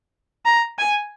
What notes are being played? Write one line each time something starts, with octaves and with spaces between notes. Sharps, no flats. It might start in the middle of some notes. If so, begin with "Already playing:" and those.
A#5
G#5